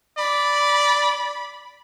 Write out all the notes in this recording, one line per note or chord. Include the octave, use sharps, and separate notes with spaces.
D5 B5